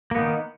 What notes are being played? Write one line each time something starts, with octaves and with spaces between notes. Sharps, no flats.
D#3 A#3 B3 D#4